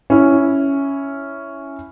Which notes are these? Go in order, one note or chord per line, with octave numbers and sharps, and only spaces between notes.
C#4 E4